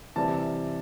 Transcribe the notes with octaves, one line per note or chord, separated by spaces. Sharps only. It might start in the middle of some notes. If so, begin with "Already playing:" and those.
C3 E3 G3 A5